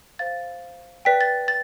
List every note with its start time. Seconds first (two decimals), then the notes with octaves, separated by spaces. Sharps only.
0.19 C5 F5 A6
1.05 B4 D5 G5 B6
1.21 A6
1.48 A6